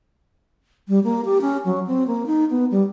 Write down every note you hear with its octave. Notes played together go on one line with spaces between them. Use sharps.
G3
A#3
G4
C#4
F#3
C4
A#3
D#4
B3
G3